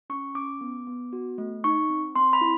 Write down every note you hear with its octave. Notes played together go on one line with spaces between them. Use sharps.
C#4 C#6
C#4 D6
B3
B3
F#4
A3
D#4 C#6
C4
C4 C6
B5
E4